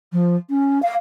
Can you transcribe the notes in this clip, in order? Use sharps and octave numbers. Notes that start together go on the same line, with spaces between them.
F3
C#4
F5